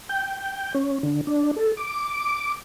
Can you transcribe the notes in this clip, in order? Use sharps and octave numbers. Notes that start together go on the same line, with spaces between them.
G5
C#4
D3
D4
A4
D6